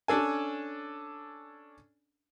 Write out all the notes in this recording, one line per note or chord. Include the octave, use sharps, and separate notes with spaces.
C#4 D4 A4 G#5